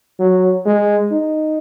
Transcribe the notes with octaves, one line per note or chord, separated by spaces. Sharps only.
F#3
G#3
D#4